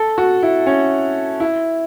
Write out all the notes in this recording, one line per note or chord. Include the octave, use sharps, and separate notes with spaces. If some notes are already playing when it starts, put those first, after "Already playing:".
Already playing: A4
F#4
E4
C#4
E4